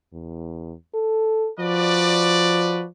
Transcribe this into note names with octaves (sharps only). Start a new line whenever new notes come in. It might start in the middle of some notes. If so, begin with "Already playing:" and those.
E2
A4
F3 F#4 B4 D5